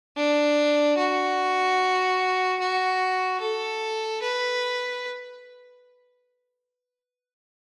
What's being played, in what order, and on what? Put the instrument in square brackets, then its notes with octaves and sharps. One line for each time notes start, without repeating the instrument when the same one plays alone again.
[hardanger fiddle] D4
F#4
F#4
A4
B4